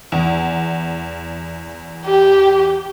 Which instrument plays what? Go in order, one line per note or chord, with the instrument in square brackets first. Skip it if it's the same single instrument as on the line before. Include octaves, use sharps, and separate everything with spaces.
[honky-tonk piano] E2
[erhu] G4